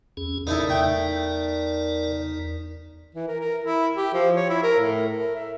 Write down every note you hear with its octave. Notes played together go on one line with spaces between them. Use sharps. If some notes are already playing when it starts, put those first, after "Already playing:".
E2 C#4 G#4
D#4 E4 A4 A#4 D5
E2 A3 D#4 G5 B6
E3
A#4
A#4
E4
G4
F3
C#5
E4
A#4
A2
A#4
E5